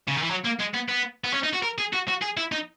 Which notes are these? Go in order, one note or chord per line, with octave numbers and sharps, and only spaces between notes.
C#3
D#3
E3
F#3
A#3
G#3
B3
B3
B3
C#4
D#4
F#4
A#4
G#4
F#4
F#4
G#4
E4
D#4